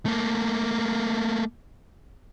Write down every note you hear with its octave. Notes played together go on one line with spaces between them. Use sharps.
A3 A#3